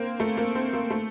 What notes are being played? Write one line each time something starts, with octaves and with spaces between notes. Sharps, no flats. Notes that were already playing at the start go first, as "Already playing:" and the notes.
Already playing: A#3 C4
A3
A#3
C4
A#3
A3